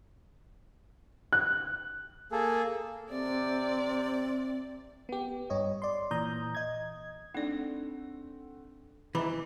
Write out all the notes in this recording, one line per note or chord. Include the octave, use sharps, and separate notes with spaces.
F#6
A#3 G#4 A4
C3 C4 D5
B3 G4
G2 C#5 D#5
D5 C6
A#2 E3 A#5 D#6 G6
D#5 G#6
A3 C4 D4 D#4 D5 F#5
D#3 E3 D#5 E5 A#5 B5 D6